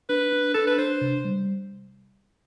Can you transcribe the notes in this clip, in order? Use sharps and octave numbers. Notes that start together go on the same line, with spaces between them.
D4 B4
D4
D4 A4
B4
D4 C5
C3
G3